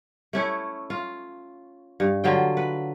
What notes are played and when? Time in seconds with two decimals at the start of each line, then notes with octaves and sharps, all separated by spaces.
0.33 A3 C#4 E4
0.90 F4
2.00 G2
2.24 D3 F#3 F4 G5
2.57 B4